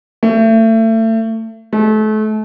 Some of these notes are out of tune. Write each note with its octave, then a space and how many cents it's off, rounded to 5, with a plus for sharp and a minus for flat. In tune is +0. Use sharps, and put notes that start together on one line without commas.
A3 +30
A3 -35